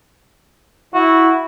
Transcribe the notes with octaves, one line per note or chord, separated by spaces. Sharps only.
E4 F#4